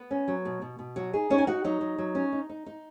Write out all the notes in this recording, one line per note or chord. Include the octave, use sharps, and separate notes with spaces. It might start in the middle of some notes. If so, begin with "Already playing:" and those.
Already playing: B3 B4
C#4
F#3
B2
B2
B2
F#3 F#4
D#4 G#4
C#4 D#4 C#5
G#5
D#4 F#4 F#5
F#3 D#4 D#5
F#3
F#3
C#4
D#4
D#4
D#4